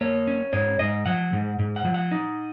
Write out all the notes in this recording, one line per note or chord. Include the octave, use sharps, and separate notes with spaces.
A#3 C#5
C#4
G#2 C#5
G#2 D#5
F3 F#5
G#2
G#2
F#5
F3
F#5
D#4